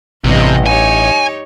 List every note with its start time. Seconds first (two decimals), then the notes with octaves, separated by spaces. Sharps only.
0.24 A1 E2 G2 C3 D#5
0.66 D#4 G4 C#5 G#5